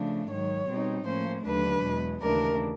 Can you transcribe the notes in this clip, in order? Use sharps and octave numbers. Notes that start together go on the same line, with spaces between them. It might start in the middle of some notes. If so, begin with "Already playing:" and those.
Already playing: C#3 F3 A3 D4
G#2 D#3 F#3 C#5
B2 G3 C4 D#4
A2 F3 A#3 C#4 C5
D#2 D3 F#3 A3 D4 B4
E2 B2 G#3
D#2 C#3 E3 A3 D4 A#4